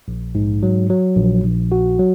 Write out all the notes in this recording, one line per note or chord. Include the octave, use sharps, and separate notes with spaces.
A#1
G#2
F#3
F#3
A#1
A#1
F#4
F#3